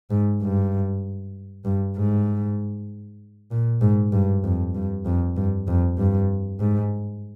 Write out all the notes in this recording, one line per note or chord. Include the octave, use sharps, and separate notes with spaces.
G#2
G2
G2
G#2
A#2
G#2
G2
F2
G2
F2
G2
F2
G2
G#2